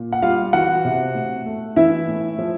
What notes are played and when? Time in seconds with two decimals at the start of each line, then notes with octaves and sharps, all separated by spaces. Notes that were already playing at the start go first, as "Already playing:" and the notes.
Already playing: A#2
0.13 F#5
0.22 G3 F4 F5
0.53 E3 F#4 F#5
0.85 C3
1.15 A2
1.46 A3
1.76 E3 E4 E5
2.08 A2
2.39 F3